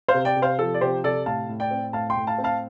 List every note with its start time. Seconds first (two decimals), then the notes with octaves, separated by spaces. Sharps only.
0.08 C5 F5
0.14 C3
0.25 D5 G5
0.36 C3
0.42 C5 F5
0.59 F3 A4
0.74 D5
0.81 C3 G4 C5
1.04 C3 A4 D5
1.26 A2 F5 A5
1.49 A2
1.60 D5 G5
1.71 C4
1.93 A2 F5 A5
2.10 G5 C6
2.16 A2
2.27 F5 A5
2.38 C4
2.44 F5 A5